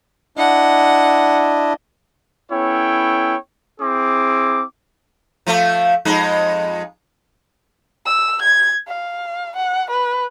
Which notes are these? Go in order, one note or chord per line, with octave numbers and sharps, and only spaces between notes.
D4 E4 D#5 F#5
B3 C#4 E4 A4 C#5 G5
C4 E4 G#4 D6
F3 A3
F2 G#3 D#4
E6
G#6
F5
F#5
B4